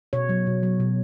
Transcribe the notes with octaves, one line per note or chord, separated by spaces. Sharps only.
B2 C#5
F#3
B2
F#3
B2